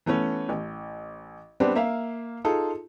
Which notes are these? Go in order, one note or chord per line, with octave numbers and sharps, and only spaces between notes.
E3 A3 B3 C#4
A1
G3 B3 C4 D4
A#3 E5 F5
D#4 F4 G#4 A4